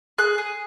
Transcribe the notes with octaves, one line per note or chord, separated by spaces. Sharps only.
G#4 F#6
G#4